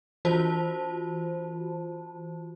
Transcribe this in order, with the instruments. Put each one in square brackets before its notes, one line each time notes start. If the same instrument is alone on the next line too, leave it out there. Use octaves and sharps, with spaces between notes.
[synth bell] E3 F4 F#4 C5 A5